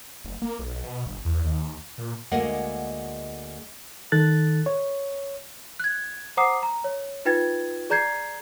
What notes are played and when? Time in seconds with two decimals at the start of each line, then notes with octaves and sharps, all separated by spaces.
0.24 F#1
0.42 A#3
0.59 B1
0.84 B2
1.06 G1
1.25 E2
1.44 D#2
1.98 A#2
2.31 D2 G#3 A#3 D#5 F#5
4.12 D#3 A4 F#6 A6
4.66 C#5
5.80 F#6 G#6
6.37 C5 F#5 A#5 D6 D#6 C7
6.63 A#5
6.84 C#5
7.25 D#4 F4 B4 G5 G#6 A6
7.90 G#4 D5 A#5 G6 G#6 C7